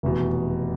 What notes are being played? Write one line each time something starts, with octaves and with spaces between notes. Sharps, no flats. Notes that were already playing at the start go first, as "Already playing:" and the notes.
F1 E2 B2